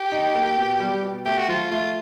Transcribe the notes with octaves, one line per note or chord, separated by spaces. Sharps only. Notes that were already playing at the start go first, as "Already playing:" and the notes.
Already playing: G4
D#4
A#3
B2
G3
B2
A3 G4
F#4
F3 F4
A3 F4